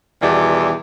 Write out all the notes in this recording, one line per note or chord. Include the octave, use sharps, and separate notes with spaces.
E2 B2 D#3 E3 G3 D5